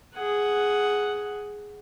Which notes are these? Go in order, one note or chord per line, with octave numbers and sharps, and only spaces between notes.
G#4 F#5